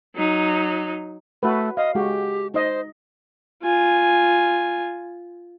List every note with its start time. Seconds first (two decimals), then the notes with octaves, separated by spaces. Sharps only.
0.15 F#3 D#4
1.43 A3 F#4 B4
1.77 D#5 F5
1.95 G#3 F#4 G4
2.54 D#4 C5 D#5
3.62 F4 G#5